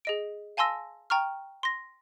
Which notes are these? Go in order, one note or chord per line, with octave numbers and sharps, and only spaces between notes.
G#4 D#5 D7
F5 G#5 A5 C6 E6 A#6
G5 A#5 C#6 F6
C6 A#6